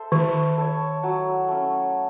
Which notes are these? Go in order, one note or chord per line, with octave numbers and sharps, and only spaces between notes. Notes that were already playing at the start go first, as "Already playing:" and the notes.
Already playing: A4 C5 E5
D#3 E4
A4 C#5
F#3
A3 C#4